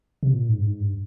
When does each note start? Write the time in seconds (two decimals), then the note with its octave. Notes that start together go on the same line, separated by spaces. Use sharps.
0.23 C3
0.33 A#2
0.49 G#2
0.58 G2
0.66 G#2
0.80 G2